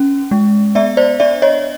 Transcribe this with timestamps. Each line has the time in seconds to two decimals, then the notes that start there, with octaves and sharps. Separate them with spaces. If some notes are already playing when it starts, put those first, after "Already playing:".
Already playing: C#4
0.31 G#3
0.75 B3 D5 E5
0.97 C5 D5
1.20 D4 D5 E5
1.42 C#5 D#5